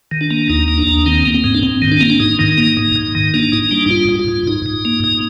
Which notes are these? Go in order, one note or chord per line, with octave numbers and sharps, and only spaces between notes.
D#3
D4
A#3
D#2 D#4
A#3
D4
D#2
D#3 C4
A#3
C4
G#2
D4
G#2 C4
D#3
D4
A#3 C4
D4
G#2 D#4
D#3
A#3
G#2
G#2
D#3
A#3 D4
G#2 D#4
G3 D4
D#4
G#2 F4
G#2
F4
G#2
G#2 D#4
G#2
A#3
G#2